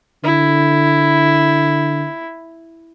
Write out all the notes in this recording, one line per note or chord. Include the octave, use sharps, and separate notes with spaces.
D3 E4